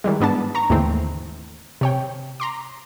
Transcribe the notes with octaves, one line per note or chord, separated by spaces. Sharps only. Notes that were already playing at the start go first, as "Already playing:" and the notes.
D#3 E3 G3 G#3
G#2 B3 D4 A5
A#5 C#6
D#2 G#2 D3 E3 A3 C4
C3 C#5 G5
A#5 C6 D6